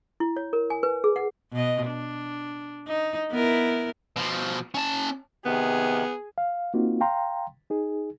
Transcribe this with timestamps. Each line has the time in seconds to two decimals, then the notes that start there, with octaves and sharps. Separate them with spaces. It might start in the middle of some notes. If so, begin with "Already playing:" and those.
0.20 E4
0.37 C#5
0.53 A#4
0.70 G#5
0.83 B4
1.04 G#4
1.16 F#5
1.52 B2 D#5
1.87 D4
2.88 D#4
3.31 B3 E4 A#4
4.16 B2 F3
4.75 C#4 A5
5.46 C3 D#3 B3 G#4
6.38 F5
6.74 A#3 C4 D#4 F4 F#4
7.01 F5 G5 A#5 C6
7.70 D#4 G#4